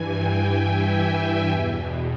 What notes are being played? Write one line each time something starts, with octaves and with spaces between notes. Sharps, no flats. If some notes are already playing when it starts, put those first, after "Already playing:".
Already playing: G2 E3 G#5
G5
E5
E2 B2